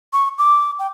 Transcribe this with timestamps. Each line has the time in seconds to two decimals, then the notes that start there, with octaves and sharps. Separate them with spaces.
0.13 C#6
0.38 D6
0.79 G5